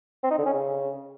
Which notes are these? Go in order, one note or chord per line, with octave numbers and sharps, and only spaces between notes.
C4
D#4
D3
C#4
C#3